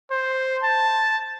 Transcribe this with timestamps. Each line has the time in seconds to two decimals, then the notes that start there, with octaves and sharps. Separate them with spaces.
0.11 C5
0.63 A5